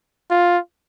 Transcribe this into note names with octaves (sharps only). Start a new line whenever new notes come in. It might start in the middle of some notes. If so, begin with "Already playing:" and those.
F4